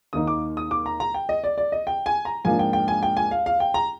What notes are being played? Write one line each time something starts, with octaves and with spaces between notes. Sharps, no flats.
D#2 D#3 A#3 D#4 D#6
D6
D#6
D6
A#5
A#5
G5
D#5
D5
D5
D#5
G5
G#5
A#5
G#2 F3 A#3 D4 F4 G#5
G5
G5
G#5
G5
G#5
F5
F5
G5
A#5